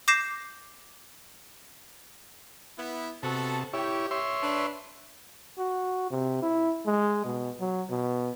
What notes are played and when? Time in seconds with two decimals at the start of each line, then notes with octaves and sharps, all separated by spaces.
0.08 D6 G6 A#6 C7 E7
2.78 B3 E4
3.23 C3 B3 F#4 A4 A5
3.73 E4 G4 C#5
4.11 C#5 E5 C6
4.43 D4 B4
5.58 F#4
6.11 C3
6.42 E4
6.86 G#3
7.25 B2
7.60 F#3
7.90 B2